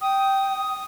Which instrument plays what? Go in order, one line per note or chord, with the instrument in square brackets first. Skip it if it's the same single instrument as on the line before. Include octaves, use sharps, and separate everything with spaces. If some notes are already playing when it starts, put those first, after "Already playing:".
[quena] G5 [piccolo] D#6